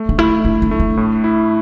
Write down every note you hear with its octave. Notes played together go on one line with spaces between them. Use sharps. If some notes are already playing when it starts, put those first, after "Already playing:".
Already playing: A3
D4
A3 E4
D4 E4
D4
A3
D4
A2
E4